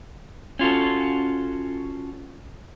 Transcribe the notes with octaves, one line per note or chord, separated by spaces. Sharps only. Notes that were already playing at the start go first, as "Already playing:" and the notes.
C#4 F4 F#4 A4